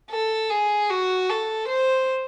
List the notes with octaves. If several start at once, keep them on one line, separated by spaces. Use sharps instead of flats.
A4
G#4
F#4
A4
C5